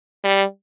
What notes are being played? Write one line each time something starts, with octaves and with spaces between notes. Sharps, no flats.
G3